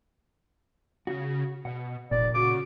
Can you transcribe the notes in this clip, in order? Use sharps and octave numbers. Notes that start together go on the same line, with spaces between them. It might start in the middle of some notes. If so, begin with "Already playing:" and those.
C#3 F#4
B2 F#5
F1 A#2 D5
C#3 F#4 D6